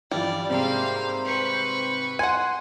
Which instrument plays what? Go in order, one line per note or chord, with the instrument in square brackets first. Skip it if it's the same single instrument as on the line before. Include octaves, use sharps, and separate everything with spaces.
[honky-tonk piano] G2 E3 F3 [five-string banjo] G3 [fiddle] D5
[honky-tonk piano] G#2 C3 C4 [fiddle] A#3 F5 [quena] C5
[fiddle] B4 C#6
[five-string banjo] F#5 G#5 [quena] C6 [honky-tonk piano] D#7